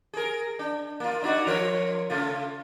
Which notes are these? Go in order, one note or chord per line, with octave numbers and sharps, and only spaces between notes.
G#4 A#4
D4
A#3 F4
D4 D#4 F#4
F3 A#4 C#5
C#3 A3 F4